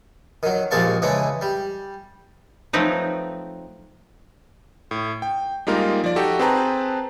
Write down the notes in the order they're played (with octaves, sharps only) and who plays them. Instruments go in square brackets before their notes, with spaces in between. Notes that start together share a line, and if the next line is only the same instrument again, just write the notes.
[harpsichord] D#3 F#3
A#1 D#2 G#3 F5 A5 C#6
C#3 E3 G#3 D4
G3
[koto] F3 F#3 A3 C4 D#4 B4
[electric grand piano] A2
G5
G3 G#3 A#3 D#4 F4 A#4
F3 D5
D#4 F#4 G4 A4
C4 G#4 B4 G5 A5 A#5